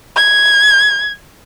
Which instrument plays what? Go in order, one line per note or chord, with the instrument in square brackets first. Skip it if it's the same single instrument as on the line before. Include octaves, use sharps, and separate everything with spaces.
[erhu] G#6